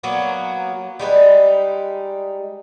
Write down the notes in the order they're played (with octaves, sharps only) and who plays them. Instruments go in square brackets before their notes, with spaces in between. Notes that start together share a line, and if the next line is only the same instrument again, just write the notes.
[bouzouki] F#3 A#3 B3 F#4
G3 G#3 D#4 B4